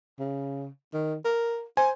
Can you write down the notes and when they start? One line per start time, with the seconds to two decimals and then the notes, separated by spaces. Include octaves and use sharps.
0.19 C#3
0.93 D#3
1.24 A#4
1.77 C5 G#5